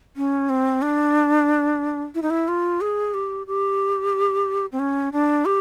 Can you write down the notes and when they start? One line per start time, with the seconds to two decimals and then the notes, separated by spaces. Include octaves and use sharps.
0.17 C#4
0.49 C4
0.82 D4
2.15 E4
2.22 D#4
2.30 E4
2.48 F4
2.81 G#4
3.14 G4
3.47 G4
4.72 C4
4.79 C#4
5.13 D4
5.45 G4